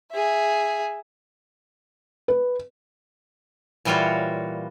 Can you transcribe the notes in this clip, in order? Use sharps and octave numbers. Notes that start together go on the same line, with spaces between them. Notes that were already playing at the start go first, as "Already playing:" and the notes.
G#4 E5
B4
A#2 E3 G3 F4 F#4 C#5